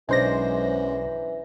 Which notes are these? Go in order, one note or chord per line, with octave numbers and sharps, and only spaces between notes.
B1 F#2 E3 G#3 D4 C5 D5 A#6